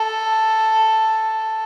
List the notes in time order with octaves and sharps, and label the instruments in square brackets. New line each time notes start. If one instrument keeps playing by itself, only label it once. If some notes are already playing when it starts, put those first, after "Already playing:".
Already playing: [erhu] A4